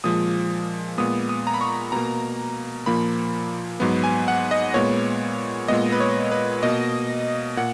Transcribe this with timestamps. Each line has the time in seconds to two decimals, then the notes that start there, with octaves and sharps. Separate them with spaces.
0.04 A#2 F3 G#3 D#6
0.98 A#2 G#3 B3 D#6
1.29 D#6
1.47 A#5
1.54 B5
1.61 C#6
1.92 B2 A#3 A#5
2.86 A#2 F3 A#3 B5
3.80 G#2 F#3 B3
4.04 G#5
4.28 F#5
4.51 D#5
4.74 A#2 G#3 B3 C#5
5.68 A#2 G#3 B3 D#5
5.92 B4
6.00 C#5
6.31 B4
6.62 B2 A#3 D#5
7.57 A#2 F#5